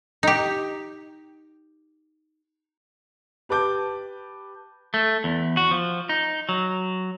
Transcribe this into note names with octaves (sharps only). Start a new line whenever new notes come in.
D#4 G4
G4 B4 A5 D6 G6
A3
E2
F#4
F3
D#4
F#3